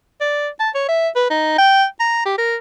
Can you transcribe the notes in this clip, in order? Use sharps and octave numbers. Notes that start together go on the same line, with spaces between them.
D5
A5
C#5
E5
B4
D#4
G5
A#5
G4
A#4